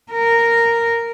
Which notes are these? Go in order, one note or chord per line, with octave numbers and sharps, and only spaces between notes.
A#4